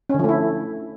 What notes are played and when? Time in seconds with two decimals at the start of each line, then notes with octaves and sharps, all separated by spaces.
0.09 C#4
0.14 D3
0.19 F3
0.24 A3
0.29 E4